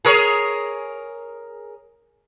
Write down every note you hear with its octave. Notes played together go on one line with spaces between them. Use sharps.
G#4 A#4 C#5